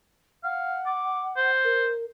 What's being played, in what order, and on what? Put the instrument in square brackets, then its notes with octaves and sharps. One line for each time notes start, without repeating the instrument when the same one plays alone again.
[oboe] F5 [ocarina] F#5
[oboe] D6
C5
[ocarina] A#4